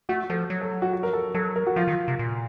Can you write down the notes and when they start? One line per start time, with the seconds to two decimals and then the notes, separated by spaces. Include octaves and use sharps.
0.09 A3 F#4
0.30 F3 A4
0.50 F#3
0.61 A4
0.82 F#4
0.93 F#4
1.03 A#4
1.13 A4
1.34 F#3 A4
1.56 A#4
1.67 F#4
1.76 F3 F4
1.88 D#3
2.08 C3
2.19 A#2